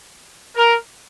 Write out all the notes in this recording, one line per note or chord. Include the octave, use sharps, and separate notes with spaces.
A#4